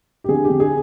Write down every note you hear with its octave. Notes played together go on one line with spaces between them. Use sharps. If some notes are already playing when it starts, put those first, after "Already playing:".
G4
D3 G#4
G4
D3
G#4